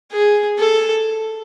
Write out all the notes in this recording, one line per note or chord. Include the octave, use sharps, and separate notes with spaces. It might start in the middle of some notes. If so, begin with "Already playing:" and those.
G#4
A4